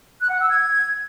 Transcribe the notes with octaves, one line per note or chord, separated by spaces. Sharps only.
F#6
F#5
E6
G#6